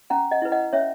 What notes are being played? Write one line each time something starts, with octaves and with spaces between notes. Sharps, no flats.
C#4 F#5 A#5
D#5 F#5
E4 B4
D#5 F#5
C#4 C#5 E5